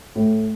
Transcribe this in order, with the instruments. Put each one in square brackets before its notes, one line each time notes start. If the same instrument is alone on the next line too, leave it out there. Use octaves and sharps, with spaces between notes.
[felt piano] A2